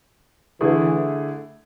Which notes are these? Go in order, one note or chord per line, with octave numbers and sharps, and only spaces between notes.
D3 E3 A3 E4 G#4